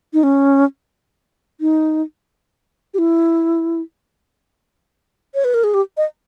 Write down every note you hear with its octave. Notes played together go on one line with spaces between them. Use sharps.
D#4
C#4
D#4
G4
E4
C#5
B4
A#4
G#4
G4
D#5